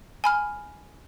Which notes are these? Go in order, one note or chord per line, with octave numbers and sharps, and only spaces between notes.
G#5 B5 F6